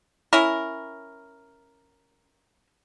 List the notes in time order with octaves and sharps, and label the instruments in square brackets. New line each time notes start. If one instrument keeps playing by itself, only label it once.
[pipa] C#4 E4 A#4